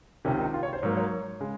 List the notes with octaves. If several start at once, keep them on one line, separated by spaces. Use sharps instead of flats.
C#2 C3 D#3 C#4
D#4
F4
C#5
C5
G#2 F#3 A#3 C#5
C#5
C#3 G#3